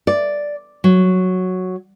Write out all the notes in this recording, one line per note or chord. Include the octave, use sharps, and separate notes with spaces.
D5
F#3